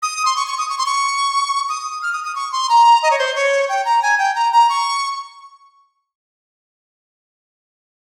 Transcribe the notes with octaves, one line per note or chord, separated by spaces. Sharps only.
D#6
C6
C#6
C#6
D#6
C#6
C6
C#6
D#6
F6
D#6
D#6
C#6
C6
A#5
D#5
C#5
C5
C#5
G5
A#5
G#5
G5
A#5
A#5
C#6